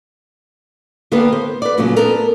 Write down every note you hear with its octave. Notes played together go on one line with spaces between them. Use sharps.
D3 A#3 B3 G4 A4 B4
C5
B4 D5
A#2 C#3 F#3 A3 C#4
B3 D4 A4 A#4